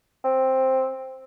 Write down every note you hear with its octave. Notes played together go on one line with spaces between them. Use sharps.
C4